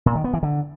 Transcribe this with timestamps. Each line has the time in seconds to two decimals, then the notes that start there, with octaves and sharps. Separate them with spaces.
0.06 A#2
0.15 D#3
0.24 B3
0.34 E3
0.43 D3